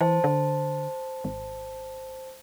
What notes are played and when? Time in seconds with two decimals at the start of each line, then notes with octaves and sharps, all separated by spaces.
0.01 E3 C5 A5
0.24 D3
1.24 G#1